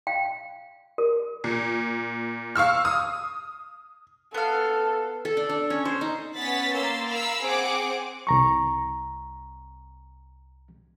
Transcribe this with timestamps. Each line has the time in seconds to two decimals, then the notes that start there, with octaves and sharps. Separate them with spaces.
0.07 F5 G5
0.98 A#4
1.44 A#2
2.55 F5 C#6 E6 F6
2.85 D#6
4.34 B3 A4 F5
5.25 A4
5.37 D4
5.49 D4
5.70 C#4
5.85 C5
6.01 D#4
6.35 B3 C#4 F#5 A6 B6
6.73 A#3 C6 E6 A6
7.08 A#4 F5 B5 E6
7.41 C4 G#4 F#5 D6 D7
8.27 C2 A#5 C#6